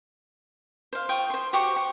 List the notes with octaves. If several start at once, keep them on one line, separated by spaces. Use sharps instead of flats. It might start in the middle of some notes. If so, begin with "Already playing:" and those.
C5 F5
F4 G5 C#6 D#6
C5 C6
F#4 G4 C5 C#6
C#6